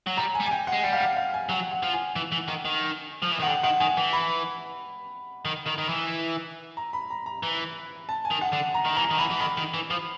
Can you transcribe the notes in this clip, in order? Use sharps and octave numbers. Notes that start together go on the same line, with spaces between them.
F#3
G3 A#5
G#5
G3
G#5
G5
F#5
G#3
G3 F#5
F5
F#5
F5
G#5
F#3 F#5
F#5
F3
G#5
E3
E3
D#3
D#3
F3
E3
D#3 F#5
D3 G5
D#3 F#5
D#3 G#5
E3
B5
D#3
D#3
D#3
E3
A#5
B5
A#5
A#5
E3
A5
G#5
D#3
F#5
D3
A#5
D#3
E3 A#5
D#3
E3 B5
E3
D#3 B5
D#3
E3
F3